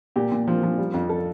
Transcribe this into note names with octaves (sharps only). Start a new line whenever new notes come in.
A#2 G4
A#2
F3
F3
G3
F2
A4